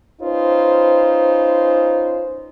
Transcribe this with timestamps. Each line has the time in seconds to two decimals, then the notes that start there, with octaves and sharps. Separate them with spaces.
0.22 C#4 D#4 F4 B4 C5